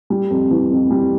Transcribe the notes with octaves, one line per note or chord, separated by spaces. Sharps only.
G3
F2
E3
F2
G3